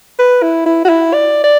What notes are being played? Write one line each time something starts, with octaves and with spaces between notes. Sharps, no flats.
B4
E4
E4
F#4
E4
D5
D5